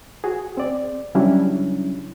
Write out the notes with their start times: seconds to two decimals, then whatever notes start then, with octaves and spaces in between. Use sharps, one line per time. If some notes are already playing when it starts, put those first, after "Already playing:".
0.24 F#4 G#4
0.57 C4 D5
1.15 C#3 F#3 G3 C#4 D4 E4